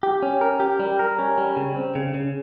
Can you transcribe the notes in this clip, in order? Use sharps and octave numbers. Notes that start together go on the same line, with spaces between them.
G4
C#4
A#4
G4
G3
A#4
C#4
G3
C#3
C4
C#3
C#3